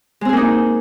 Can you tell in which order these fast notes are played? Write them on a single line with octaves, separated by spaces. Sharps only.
G#3 C4 G#4 A#3 D#4